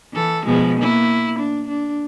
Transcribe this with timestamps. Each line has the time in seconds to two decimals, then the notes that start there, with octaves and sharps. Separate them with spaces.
0.13 E3 A4
0.46 B2 F3 G#3
0.80 A#3 E4
1.39 D4
1.68 D4